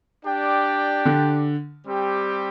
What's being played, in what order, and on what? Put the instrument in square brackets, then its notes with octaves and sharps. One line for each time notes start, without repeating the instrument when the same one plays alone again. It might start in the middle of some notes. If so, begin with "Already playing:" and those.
[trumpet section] D4 G4 D5 G5
[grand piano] D3
[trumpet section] G3 C4 G4